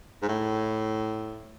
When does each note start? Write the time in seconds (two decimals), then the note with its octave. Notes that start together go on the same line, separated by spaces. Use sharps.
0.22 G#2
0.29 A2